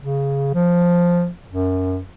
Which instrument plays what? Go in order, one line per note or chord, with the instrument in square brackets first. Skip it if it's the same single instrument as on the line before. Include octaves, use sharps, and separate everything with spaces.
[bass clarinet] C#3
F3
F#2